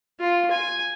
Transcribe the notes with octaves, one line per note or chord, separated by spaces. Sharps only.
F4
G#5